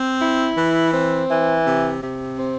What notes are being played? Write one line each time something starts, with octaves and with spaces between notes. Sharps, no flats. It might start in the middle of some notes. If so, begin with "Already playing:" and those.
Already playing: C4
E4
E3
C4
E3
C3
C3
C4